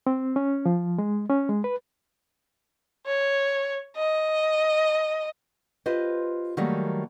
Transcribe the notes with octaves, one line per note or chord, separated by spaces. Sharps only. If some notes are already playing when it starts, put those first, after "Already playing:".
C4
C#4
F3
G#3
C#4
G#3
B4
C#5
D#5
F4 G4 B4 C5 D#5
D#3 F#3 G3 A3 A#3